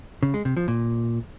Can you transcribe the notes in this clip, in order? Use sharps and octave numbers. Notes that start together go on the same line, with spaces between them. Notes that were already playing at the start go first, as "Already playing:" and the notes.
C#3
G#3
C3
F3
A#2